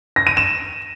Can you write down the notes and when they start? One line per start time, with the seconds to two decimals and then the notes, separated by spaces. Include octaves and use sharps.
0.16 A#6
0.27 D#7
0.37 E7